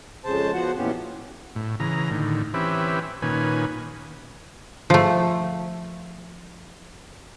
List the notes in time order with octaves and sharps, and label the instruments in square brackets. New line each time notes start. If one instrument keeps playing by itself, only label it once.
[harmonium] F2 C#3 G#3 C5 A5
F3 B3 F#4 C5 F#5
A#2 E3 B3 C#4 G4
[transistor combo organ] A2
C#3 E3 A#5
A2 D3 D#3
E3 C4 C#4 G4 B4 E5
A#2 D#3 C#4 B4 G#5
[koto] F3 A3